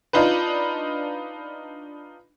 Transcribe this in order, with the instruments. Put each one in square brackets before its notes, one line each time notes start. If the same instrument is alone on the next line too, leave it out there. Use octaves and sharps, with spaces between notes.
[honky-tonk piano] D4 D#4 F4 B4